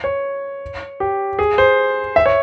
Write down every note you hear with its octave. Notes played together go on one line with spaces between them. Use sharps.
C#5
G4
G#4
C5
E5
C#5